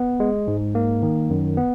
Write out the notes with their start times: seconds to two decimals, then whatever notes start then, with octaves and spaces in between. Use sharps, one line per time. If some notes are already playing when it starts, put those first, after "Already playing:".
Already playing: B3
0.20 G#3
0.48 G#2
0.75 A#3
1.03 D#3
1.30 F#2
1.57 B3